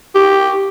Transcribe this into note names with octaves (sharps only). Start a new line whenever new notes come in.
G4